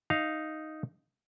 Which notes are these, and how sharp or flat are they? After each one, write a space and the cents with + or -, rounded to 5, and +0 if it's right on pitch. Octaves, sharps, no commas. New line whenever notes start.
D#4 +0 F5 -5